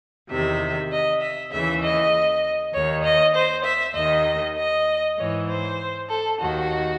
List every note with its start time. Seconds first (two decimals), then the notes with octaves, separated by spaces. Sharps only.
0.30 E2 C3 D#3 E5
0.91 D#5
1.21 E5
1.52 D#2 C#3 E3 E5
1.83 D#5
2.74 D#2 D#3 C#5
3.04 D#5
3.34 C5
3.65 E5
3.95 D#2 D#3 D#5
4.57 D#5
5.18 G#2 E3 C#5
5.47 C5
6.08 A4
6.39 D#2 D#3 F#4